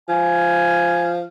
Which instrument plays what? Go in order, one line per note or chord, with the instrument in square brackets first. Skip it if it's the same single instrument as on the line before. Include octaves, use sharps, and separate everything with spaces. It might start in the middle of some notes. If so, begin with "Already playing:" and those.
[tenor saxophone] F3 [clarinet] G#5